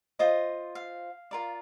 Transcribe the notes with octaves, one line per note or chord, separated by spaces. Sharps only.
F4 C5 D#5
F5
F4 A#4 D5